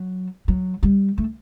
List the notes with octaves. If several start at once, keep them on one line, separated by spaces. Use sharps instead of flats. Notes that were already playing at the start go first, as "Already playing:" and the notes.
Already playing: F#3
F#3
G3
A3